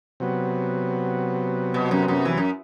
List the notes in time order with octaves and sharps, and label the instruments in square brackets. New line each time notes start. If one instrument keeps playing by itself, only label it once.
[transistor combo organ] C3 F#3 B3
[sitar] B2
F#2
F#2
E3
F#2